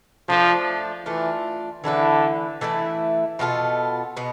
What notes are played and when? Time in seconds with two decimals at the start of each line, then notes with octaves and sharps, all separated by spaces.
0.28 F3 A3 D4 F4
1.06 E3 A3 D4 F4
1.84 D3 E3 A3 E4 B4
2.61 E3 A3 E4 B4
3.39 B2 B3 F4 A4
4.17 B2 B3